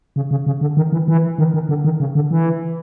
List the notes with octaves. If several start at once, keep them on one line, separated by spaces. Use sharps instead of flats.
C#3
C#3
C#3
D3
D#3
E3
E3
D#3
D#3
D3
D#3
C#3
D3
E3